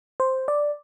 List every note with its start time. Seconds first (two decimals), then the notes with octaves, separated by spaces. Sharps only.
0.20 C5
0.48 D5